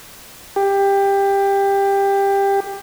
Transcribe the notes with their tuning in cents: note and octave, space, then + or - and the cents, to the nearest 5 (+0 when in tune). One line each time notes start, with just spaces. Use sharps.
G4 +15